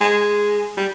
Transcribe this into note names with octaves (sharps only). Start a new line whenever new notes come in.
G#3
G3